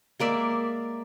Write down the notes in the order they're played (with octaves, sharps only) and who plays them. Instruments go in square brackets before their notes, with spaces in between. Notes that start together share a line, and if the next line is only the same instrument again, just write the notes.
[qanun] G#3 A#3 D5 E5